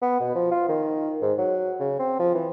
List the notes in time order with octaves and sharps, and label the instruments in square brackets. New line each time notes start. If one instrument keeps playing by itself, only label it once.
[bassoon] B3
B2
F3
F4
D#3
G#2
F#3
C#3
C4
F3
E3